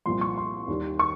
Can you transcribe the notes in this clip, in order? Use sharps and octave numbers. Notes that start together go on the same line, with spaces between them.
C2 A#2 F3 C6
C#6
C6
D#2 D#3 G3
C#6